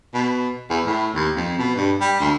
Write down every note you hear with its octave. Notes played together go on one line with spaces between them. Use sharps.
B2
E2
A2
D#2
F2
B2
G2
G3
D2